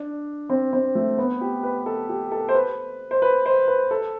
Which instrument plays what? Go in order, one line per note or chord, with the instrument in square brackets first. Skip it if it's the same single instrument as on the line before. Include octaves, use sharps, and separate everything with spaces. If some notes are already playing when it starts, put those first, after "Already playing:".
Already playing: [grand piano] D4
C4
C4
A3
B3
G4
B4
A4
G4
A4
C5
B4
C5
B4
C5
B4
A4